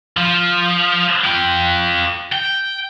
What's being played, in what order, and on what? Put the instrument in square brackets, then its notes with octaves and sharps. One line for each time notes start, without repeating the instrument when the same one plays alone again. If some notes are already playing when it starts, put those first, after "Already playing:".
[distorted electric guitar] F3
F4 G5
G5